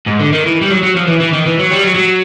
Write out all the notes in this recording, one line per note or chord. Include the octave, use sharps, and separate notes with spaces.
G#2
D3
D#3
E3
G3
F#3
F#3
F3
E3
E3
D#3
E3
F#3
G3
F#3
F#3